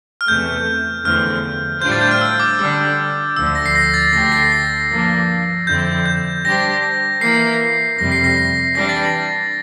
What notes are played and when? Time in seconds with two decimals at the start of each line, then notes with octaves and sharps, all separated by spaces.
0.21 F6
0.27 E2 C3 E3 A3 G6
1.05 E2 D3 F3 A3 C4 F6
1.82 A2 G3 D4 F4 C5 G6
1.92 A6
2.01 G6
2.11 F6
2.21 E6
2.40 D6
2.59 D3 G3 D4 E6
3.36 D2 D3 F3 E6
3.46 E6
3.55 A#6
3.66 C7
3.75 A#6
3.94 A6
4.13 D2 D3 A3 D4 G4 A#6
4.32 C7
4.52 A#6
4.90 G2 F3 A#3 D4
5.67 F2 D3 F3 C4 E4 G6
6.06 G6
6.45 G3 D4 G4 C5 A#6
7.21 E3 A#3 E4 A#4 C7
7.98 F2 C3 G3 A#6
8.12 C7
8.24 A#6
8.37 A#6
8.75 E3 G3 D4 A#6
8.89 A6
9.03 A#6